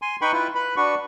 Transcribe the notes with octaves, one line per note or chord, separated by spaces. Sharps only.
G#5 C6
D#4 B4 G5 B5 C#6
E4 F4 B4
B4 B5
D4 F#4 B4 C#6